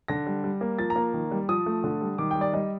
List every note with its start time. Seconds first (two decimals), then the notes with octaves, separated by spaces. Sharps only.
0.08 D3 A#6
0.26 G3
0.44 G3
0.61 A#3
0.79 F3 A6
0.90 A#5
0.96 A#3
1.14 D#3
1.31 G3
1.49 F3 D#6
1.66 A3
1.84 D3
2.01 G3
2.18 D#3 D6
2.31 G3 G5
2.41 D5
2.53 G3 D#5